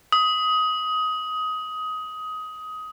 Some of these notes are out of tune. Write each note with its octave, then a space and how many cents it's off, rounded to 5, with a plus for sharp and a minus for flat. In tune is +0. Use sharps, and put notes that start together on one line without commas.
D#6 +20